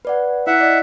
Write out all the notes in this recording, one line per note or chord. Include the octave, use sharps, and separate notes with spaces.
B4 D5 F#5
E4 E5 F#5
D5 D#5